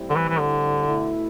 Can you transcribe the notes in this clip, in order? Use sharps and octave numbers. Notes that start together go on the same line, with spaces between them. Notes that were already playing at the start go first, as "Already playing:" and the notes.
Already playing: A2 G3 C4 E4
D3
E3
E3
D3
B2 A3 E4